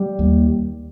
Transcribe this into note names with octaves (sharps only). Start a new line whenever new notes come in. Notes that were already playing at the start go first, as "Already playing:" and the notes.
Already playing: G3
D#2